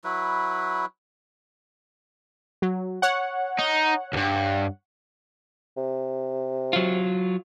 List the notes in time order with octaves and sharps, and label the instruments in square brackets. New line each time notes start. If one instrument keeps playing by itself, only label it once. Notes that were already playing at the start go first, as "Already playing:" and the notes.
[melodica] F#3 E4 B4
[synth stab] F#3
C#5 F#5
[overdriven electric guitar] D#4
D2 G2
[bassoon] C3
[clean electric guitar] F#3 F4